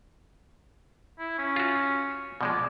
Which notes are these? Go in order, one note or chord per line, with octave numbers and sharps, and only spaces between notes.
E4
C#4
F4 F#4
B2 F3 G#3 D5